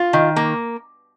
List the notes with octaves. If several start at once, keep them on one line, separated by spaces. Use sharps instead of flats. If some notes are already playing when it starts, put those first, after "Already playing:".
Already playing: F4
D#3
A#3